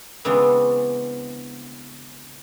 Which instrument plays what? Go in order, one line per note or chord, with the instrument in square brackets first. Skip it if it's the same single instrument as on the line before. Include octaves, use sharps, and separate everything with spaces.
[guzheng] C#3 E3 G#3 B3 C4 D4